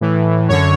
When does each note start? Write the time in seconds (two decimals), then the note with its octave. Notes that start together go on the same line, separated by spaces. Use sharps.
0.01 A2 E3
0.49 F#2 D3 C#5